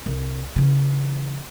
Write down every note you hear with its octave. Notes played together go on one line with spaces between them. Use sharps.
C2
C#3 E3